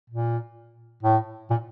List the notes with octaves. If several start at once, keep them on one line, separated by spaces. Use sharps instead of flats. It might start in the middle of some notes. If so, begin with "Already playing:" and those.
A#2
A2
A#2